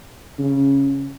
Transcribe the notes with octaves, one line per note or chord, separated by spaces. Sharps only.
C#3